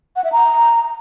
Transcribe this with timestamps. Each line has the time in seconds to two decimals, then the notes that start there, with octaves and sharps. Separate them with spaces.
0.16 F#5
0.24 E5
0.32 A#5